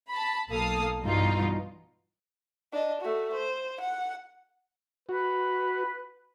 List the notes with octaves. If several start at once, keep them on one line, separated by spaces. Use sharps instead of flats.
A5 B5
B1 A#3 A4 F5 D#6
G2 B2 E3 D#4 F4
D4 D#5
A3 F#4
C5
F#5
F#4 B4